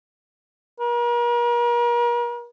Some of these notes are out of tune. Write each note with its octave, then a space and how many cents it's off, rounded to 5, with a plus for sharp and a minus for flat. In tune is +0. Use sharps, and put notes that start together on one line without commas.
A#4 +40